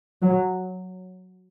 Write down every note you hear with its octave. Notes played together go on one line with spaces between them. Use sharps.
F#3